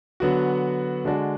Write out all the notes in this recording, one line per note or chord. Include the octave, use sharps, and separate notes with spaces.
D3 F#3 B3 F#4
D3 G#3 D4 F#4